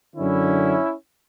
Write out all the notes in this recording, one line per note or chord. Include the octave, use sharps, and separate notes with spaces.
F#2 D3 C#4 E4